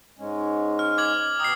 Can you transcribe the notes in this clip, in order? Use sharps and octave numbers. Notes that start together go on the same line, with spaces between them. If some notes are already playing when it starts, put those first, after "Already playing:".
G#2 G#3 C#4
F6
D6 G#6 F#7
B2 G5 A#5 D#6 C7